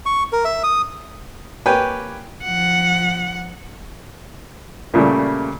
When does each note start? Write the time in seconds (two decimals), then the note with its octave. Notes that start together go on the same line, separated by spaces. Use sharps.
0.06 C#6
0.32 A#4
0.45 E5
0.63 D#6
1.66 A#3 G4 B4 C#5 G5 G#5
2.44 F3 F#5
4.94 A#2 C#3 G3 A3